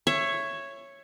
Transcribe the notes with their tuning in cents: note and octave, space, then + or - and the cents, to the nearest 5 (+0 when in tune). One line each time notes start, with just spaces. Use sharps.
C#5 -5 E5 +20